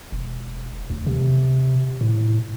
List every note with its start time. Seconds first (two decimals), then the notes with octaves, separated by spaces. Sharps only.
0.12 E1
0.90 D2
1.06 C3
2.01 A2